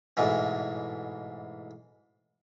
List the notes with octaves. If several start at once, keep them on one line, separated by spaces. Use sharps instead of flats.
A1 G#2 B2 E3